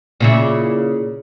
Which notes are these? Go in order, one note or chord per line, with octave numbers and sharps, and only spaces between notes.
A#2 C#3 E4